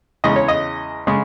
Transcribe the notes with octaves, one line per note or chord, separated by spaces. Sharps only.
E2 C#3 G#3 D#5
C#5
D#5
C#3 G#3